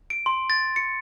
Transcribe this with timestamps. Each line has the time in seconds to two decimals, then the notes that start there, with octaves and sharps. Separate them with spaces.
0.10 D7
0.26 C6
0.50 A6
0.76 C#7